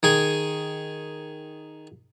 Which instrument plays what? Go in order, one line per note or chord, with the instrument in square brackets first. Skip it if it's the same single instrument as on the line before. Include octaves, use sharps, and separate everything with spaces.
[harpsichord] D#3 G#4 G#5